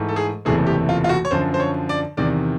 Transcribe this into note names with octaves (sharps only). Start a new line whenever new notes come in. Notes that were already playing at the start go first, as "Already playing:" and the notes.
Already playing: G#2 E3 A3
A4
G#4
F#1 E2 C3 E3 A3 G#4
G4
F4
F4
F#4
C#5
F#2 D3 F3 C5
C5
C#5
D5
E2 C3 D#3 D5